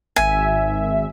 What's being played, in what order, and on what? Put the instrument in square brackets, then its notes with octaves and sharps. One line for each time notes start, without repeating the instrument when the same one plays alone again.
[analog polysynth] G#1 E5 [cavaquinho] G#5